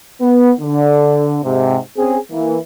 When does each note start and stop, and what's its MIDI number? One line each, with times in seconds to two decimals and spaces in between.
0.22 0.53 59
0.60 1.38 50
1.44 1.78 44
1.44 1.78 48
1.98 2.18 60
1.98 2.18 61
1.98 2.18 68
2.31 2.58 52
2.31 2.58 58